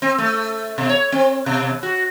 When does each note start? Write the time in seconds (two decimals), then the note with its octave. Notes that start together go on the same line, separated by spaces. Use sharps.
0.02 C4
0.18 A3
0.78 B2
0.89 C#5
1.12 C4
1.46 B2
1.83 F#4